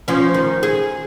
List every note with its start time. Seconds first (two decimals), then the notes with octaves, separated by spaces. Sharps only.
0.08 F3 C#4
0.34 D#3
0.63 G#4